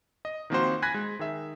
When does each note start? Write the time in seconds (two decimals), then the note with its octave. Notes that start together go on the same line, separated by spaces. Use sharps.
0.25 D#5
0.50 D#3 F3 A#3 C4 F#4 C5
0.82 G#5 B5 F#6 G#6 A#6 B6
0.94 G#3
1.19 D#3 G#4 E5